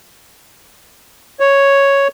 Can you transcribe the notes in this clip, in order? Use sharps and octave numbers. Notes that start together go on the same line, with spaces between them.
C#5